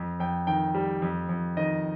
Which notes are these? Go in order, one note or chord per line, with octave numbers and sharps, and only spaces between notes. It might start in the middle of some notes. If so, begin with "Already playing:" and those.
Already playing: F2
F2 G5
D#3 G5
G3
F2
F2
D#3 D#5